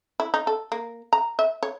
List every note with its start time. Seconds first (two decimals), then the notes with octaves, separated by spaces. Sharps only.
0.20 E4
0.34 D#4
0.47 A4
0.72 A#3
1.13 A#5
1.39 E5
1.63 C#5